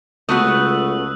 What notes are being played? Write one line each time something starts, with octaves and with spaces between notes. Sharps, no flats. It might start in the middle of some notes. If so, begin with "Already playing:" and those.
C#2 A3 B3 F#4 D#6 E6 F#6